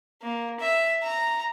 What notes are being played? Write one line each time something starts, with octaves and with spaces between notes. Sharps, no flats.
A#3
E5
A#5